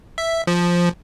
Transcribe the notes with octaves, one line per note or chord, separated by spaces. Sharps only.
E5
F3